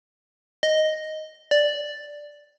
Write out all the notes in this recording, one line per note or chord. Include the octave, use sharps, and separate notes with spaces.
D#5
D5